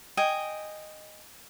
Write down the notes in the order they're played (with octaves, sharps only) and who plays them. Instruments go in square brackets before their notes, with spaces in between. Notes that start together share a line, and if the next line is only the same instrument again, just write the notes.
[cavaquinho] D#5 G5 G#5